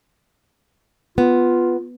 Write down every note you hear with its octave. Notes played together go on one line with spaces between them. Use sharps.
B3 F4